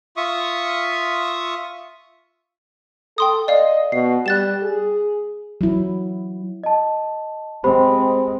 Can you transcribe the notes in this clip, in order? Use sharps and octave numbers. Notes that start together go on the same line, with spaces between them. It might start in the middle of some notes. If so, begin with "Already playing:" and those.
F4 E5 C#6 D#6
A4 G5 C6 D#6
D5 D#5 F5
B2 C7
G3 F#6 A6 E7
G#4
F#3 E4
D#5 A5
G#3 C4 G4 C5 B5